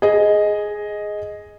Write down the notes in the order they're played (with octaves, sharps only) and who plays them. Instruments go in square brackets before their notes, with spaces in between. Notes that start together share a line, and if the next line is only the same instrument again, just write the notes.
[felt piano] G#4 D#5